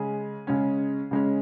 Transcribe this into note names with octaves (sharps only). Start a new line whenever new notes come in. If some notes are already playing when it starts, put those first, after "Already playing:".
Already playing: C#3 G#3 C#4 G#4
C#3 G#3 C#4
C#3 G#3 C#4